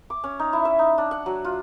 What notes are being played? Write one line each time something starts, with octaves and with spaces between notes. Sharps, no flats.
D6
C#4
D#4
E4
E5
D#4
D4
F#5
F#3
F4